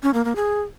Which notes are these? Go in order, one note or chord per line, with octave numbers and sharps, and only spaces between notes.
C#4
A#3
A#3
G#4